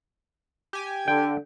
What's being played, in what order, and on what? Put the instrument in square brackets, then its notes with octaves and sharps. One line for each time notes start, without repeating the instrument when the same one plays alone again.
[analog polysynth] G4 G#5
[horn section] D3 [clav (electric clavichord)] G5